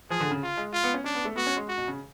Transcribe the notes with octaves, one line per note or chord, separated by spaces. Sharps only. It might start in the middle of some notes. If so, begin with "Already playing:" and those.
F3 G#4
D3
C#3
F4
G#3
F4
B3
C#4
C#4 D4
B3
A3
B3 F#4
C#4
G#3
F#4
B2
C#3